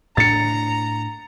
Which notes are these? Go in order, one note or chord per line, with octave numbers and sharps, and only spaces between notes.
A2 D4 A#5 A6 C#7